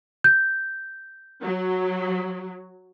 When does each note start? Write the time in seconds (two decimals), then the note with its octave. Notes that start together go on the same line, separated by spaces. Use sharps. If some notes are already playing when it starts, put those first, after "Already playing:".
0.24 G6
1.43 F#3